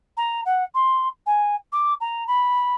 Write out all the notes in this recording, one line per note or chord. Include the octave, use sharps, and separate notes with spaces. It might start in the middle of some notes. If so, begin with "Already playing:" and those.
A#5
F#5
C6
G#5
D6
A#5
B5